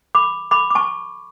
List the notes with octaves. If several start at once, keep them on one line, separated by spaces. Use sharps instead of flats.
B5 D6
B5 D6
D6
A5 C#6